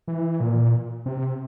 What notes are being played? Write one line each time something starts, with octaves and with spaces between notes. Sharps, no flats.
E3
A#2
C3